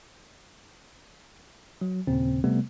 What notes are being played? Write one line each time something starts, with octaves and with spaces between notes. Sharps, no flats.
F#3
D#2 A#2 C#3 C4
C3 G3 A3 B3